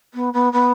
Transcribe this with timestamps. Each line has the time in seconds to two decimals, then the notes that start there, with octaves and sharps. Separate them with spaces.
0.14 B3
0.33 B3
0.52 B3